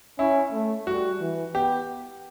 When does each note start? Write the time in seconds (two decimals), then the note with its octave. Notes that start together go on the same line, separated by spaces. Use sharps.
0.19 C#4 E4
0.52 A3
0.87 G3 F#4
1.20 E3
1.55 B3 G4